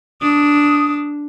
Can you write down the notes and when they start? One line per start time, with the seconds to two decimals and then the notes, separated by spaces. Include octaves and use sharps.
0.22 D4 D#6